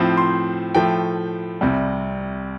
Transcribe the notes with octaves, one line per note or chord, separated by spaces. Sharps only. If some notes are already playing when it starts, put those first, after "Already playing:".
Already playing: A2 F3 C4
C6
A2 F3 A3 G5
C2 C3 G3